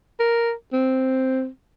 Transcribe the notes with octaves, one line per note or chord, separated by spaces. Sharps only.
A#4
C4